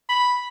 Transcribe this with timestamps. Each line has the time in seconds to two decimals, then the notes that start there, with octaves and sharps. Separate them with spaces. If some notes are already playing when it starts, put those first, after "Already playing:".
0.09 B5